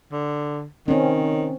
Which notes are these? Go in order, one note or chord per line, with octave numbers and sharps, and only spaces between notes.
D3
D#3 C4 C#4